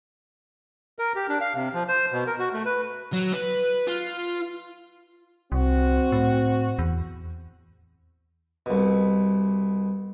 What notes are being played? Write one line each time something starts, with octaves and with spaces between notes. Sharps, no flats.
A#4
G4
D4
F5
C3
F3
C5
B2
A#4
F#4
A3
B4
F#3
B4
F4
C2 C4 F#4
A2
E2
C2 B2